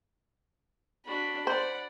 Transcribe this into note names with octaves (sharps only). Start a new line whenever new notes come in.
D4 F#4 B5
C5 D5 F#5